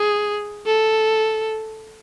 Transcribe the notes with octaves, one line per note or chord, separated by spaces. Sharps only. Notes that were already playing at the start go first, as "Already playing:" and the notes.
Already playing: G#4
A4